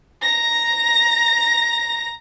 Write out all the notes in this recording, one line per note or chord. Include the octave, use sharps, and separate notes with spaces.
A#5 A#6